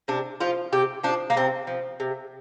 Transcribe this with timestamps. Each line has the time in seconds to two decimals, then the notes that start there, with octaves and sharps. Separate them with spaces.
0.08 C3 D4
0.40 F3 F4
0.73 C3 G4
1.04 F3 D4
1.30 A#3
1.36 C3 C4
1.67 F3
2.00 C3